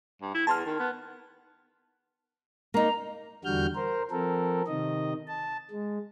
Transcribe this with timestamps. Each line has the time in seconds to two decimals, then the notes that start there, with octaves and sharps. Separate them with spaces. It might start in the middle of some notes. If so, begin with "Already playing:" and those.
0.22 G2
0.35 E4
0.47 E2 A5 C6 F6
0.66 D#3
0.80 B3
2.74 A#3 D#4 A#5
3.45 E2 D3 G3 F#4 F6 G6
3.75 A#4 C5
4.11 F3 C4 A4 A#4
4.67 C3 D#3 D#5
5.27 A5
5.71 G#3